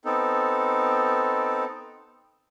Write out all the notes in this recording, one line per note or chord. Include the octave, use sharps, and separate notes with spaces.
B3 C4 D#4 A4